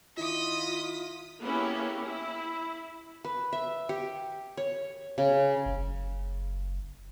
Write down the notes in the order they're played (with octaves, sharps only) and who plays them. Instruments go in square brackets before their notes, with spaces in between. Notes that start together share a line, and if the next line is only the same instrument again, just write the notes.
[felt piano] D#3 E4 [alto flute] F4 [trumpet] D#5 [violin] D#6 B6
[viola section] A#3 B3 C#4 E4 G4 G#4
E4
[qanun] B4
E5
G4
C#5
C#3
[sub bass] F#1